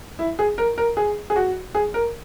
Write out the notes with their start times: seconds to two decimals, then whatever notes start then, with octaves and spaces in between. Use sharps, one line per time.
0.19 E4
0.39 G#4
0.58 A#4
0.78 A#4
0.97 G#4
1.30 G#4
1.36 F#4
1.75 G#4
1.94 A#4